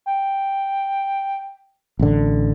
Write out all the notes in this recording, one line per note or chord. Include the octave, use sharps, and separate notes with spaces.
G5
A1 D3